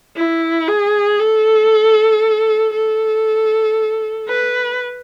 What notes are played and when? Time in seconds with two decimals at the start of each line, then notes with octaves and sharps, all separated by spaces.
0.16 E4
0.68 G#4
1.19 A4
2.74 A4
4.28 B4